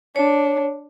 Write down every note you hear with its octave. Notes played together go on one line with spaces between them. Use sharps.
D4 C#5